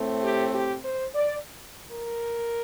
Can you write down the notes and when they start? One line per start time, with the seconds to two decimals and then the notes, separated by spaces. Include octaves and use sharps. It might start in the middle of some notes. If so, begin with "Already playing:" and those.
Already playing: A2 A3 C4
0.24 G4
0.54 G4
0.85 C5
1.15 D5
1.90 A#4